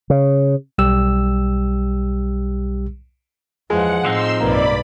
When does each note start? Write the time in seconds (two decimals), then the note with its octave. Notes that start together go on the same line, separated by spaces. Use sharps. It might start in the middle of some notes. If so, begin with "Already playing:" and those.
0.10 C#3
0.78 B1 G3 G4 E6
3.70 E2 F3 G#3 F#5
4.05 A2 F3 C4 D#4 C6 E6
4.40 B1 G2 A#3 D5 B5